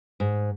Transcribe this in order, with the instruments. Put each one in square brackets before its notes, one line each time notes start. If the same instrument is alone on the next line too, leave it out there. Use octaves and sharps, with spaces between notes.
[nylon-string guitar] G#2